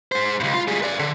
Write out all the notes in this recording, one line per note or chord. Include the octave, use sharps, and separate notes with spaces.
G#3 C5
C#2 G2
F4
G3 G#4
B4 D5
D3